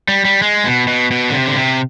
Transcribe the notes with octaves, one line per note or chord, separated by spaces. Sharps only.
G3
G3
G#3
B2
B2
B2
D3
C3
D3
C3